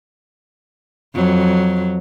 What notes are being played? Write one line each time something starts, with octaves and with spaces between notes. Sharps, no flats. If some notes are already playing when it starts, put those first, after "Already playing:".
F2 F#3